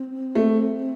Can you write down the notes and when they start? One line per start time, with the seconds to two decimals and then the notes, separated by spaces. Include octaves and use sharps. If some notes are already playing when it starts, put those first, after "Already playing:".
Already playing: C4
0.35 A3